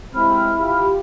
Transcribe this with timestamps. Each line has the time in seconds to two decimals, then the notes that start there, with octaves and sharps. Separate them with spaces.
0.14 D#2 G#3 C4 E4 B5 F6
0.60 F4 G4